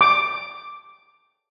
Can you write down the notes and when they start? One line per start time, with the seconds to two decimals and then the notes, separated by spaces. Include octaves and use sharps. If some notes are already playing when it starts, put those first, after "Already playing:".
0.01 D6